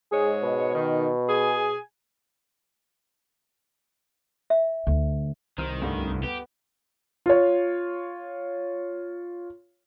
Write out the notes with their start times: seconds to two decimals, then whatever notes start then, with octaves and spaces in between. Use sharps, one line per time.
0.11 G#2 G#3 G#4 C#5
0.43 B2
0.74 D#3
1.28 G#4 G#5
4.50 E5
4.87 D2
5.58 C2 D#3 C5 F6
5.82 D2 G2
6.23 B3 G4
7.26 F4 C#5